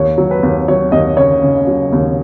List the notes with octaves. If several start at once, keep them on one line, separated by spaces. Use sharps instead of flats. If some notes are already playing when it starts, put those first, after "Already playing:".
Already playing: D#2 C#5
F#3
B4
D#2
F#3 C#5
D#2 D#5
C#3 C#5
C#3
F#3
D#2